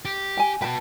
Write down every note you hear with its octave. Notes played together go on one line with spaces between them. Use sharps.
G4
G5 G#5
F#4 B4 G5 A5